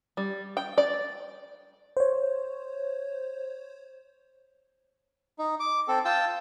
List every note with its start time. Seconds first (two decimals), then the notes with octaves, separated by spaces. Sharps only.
0.17 G3
0.57 G5
0.78 D5
1.97 C5 C#5
5.39 D#4
5.60 D6
5.88 C4 A4
6.05 F4 G5 A5 E6